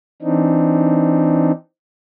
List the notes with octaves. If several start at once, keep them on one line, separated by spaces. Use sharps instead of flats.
E3 C4 D4 D#4